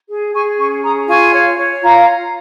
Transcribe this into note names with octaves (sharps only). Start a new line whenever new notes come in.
G#4
G#4 G#5 C#6
C#4 G#5 C#6
G#4 A#5 D#6
F4 G#5 C#6
C#5
C#5
F4 F5 A#5